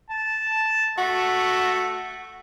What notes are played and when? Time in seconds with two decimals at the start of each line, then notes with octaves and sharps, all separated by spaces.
0.10 A5
0.98 A3 F#4